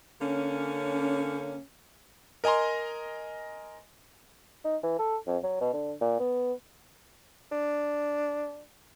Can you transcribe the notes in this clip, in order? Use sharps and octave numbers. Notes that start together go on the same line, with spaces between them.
D3 A#3 C#4
A#4 D#5 G#5 A#5 C6
D#4
E3
A4
F2
F#3
B2
D3
A#2
B3
D4